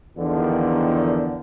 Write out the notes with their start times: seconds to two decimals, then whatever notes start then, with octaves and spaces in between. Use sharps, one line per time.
0.17 E2 D3 D#3 F3